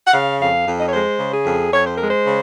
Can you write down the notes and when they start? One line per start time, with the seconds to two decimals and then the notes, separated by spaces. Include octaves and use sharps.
0.07 F#5
0.13 C#3 F5
0.39 F2 F5
0.67 F2
0.80 D#5
0.86 C#5
0.93 G#3 C5
1.19 C#3
1.33 G#4
1.46 F2
1.72 F2 C#5
1.85 C5
1.97 G#3 A#4
2.09 C5
2.26 C#3